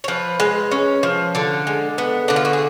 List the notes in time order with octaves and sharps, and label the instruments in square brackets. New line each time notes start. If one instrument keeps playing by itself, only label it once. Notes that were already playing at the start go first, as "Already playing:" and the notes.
[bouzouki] C#5
F3 B4
G#3
C#4
F3
D3 A4
G#3
B3
D3 D4
F4
F#4
G#4